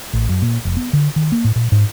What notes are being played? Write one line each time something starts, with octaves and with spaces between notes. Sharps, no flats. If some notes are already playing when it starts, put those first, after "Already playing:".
A1
F#2
A#2
F1
B3
D3
D#3
A#3
A2
A#2
G#2